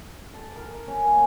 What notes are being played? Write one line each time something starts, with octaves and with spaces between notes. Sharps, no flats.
A4
A#4
C#4
A#3